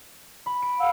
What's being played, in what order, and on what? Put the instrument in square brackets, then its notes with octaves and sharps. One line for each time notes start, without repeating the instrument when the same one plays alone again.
[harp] B5
D7
[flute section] F5 F#5 E6